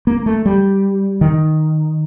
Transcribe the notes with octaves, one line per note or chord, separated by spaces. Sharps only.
A#3
A3
G3
D#3